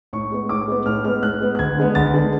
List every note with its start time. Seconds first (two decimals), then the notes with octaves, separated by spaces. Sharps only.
0.13 A2 C#6
0.31 G#3 B3
0.49 A2 D6
0.67 G#3 B3
0.86 A2 F6
1.04 G#3 B3 F6
1.22 A2 F#6
1.41 G#3 B3
1.55 F#6
1.59 D2 G#6
1.77 D3 G#3 B3
1.95 D2 A6
2.14 D3 G#3 B3